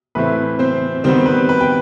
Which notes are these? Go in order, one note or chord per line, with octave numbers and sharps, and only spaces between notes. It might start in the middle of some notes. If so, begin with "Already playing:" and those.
A2 E3 A3 C4 B4
C4 C5
D#3 G3 B3 C4 C5
B4
B4
G5